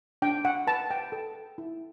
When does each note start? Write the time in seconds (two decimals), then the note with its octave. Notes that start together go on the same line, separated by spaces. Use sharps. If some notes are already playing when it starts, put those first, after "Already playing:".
0.22 D4 G5
0.45 F#5
0.67 B4 A5
0.91 G5
1.12 A4
1.58 E4